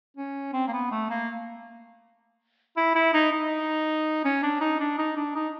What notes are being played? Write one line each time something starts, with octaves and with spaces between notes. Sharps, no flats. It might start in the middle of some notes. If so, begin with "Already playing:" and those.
C#4
C4
A#3
B3
A3
A#3
E4
E4
D#4
D#4
C#4
D4
D#4
D4
D#4
D4
D#4